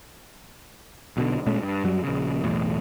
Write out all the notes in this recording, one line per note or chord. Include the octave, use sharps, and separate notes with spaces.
B1 B2 D3
A#2 G#3 A3 C#4
G2
F#2 F#3 G3
A#1 C#3
B1 E2 A2